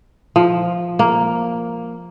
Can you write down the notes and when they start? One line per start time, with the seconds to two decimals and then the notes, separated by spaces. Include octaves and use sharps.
0.36 F3
0.99 A#3